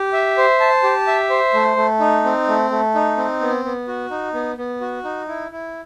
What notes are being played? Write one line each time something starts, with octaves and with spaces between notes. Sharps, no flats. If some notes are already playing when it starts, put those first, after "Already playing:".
Already playing: G4
E5
C5
A5
G4
E5
C5
A3
A3
D#4
C4
A3
A3
D#4
C4
B3
B3
F#4
D#4
B3
B3
F#4
D#4
E4
E4